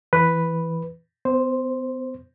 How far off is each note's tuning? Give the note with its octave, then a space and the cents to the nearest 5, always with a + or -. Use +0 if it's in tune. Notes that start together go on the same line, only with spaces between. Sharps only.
E3 +0 B4 +0
B3 +45 C5 +0